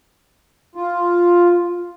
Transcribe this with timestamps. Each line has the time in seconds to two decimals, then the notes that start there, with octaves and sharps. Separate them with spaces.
0.75 F4